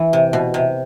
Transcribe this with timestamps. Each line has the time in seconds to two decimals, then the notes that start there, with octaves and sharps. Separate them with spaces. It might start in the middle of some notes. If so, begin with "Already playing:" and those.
Already playing: E3
0.13 C3
0.33 B2
0.54 C3